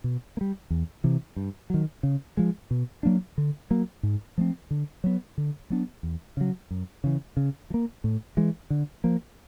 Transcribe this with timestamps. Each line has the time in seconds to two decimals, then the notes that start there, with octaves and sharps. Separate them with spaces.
0.04 B2
0.37 A#3
0.41 G3
0.70 E2
1.04 C3 E3
1.36 G2
1.70 D#3 F#3
2.03 C#3
2.37 F3 G#3
2.71 B2
3.03 F#3 A#3 D4
3.38 D3
3.71 F#3 A#3
4.03 G#2
4.38 F3 A3 C4
4.71 D3
5.04 F#3 B3
5.38 D3
5.70 F#3 B3 D4
6.03 E2
6.37 C#3 F#3
6.71 F#2
7.04 C#3 E3
7.37 C#3
7.70 F3
7.74 A#3
8.04 A2
8.37 E3 G#3
8.70 D3
9.04 F3 A#3